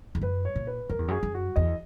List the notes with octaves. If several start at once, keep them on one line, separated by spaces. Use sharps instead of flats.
E2
F#2 B4
C#5
A#2
B4
F#2 A#4
E2
F#2 G#4
F#2
F#4
E2 D#5